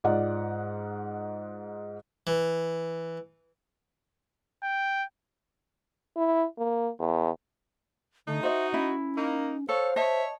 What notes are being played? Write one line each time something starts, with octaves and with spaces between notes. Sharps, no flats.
G#2 F4 D5 D#5 F#5
E3
G5
E4
A#3
E2
D3 A3 D#4
F#4 C5 D#5 E5
C#4 E4
A#3 D#4
A4 C5 C#5 F5
C#5 D#5 E5 A5